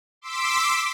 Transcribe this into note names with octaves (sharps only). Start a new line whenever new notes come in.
C6 D6 E6 B6 D7